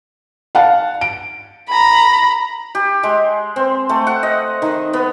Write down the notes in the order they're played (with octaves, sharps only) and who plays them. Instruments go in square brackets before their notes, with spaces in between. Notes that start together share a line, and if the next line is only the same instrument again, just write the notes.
[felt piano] F5 F#5 A5
D7
[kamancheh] A#5 B5
[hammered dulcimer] G4
G#3
C4
A3
F#5
D#5
D#3
B3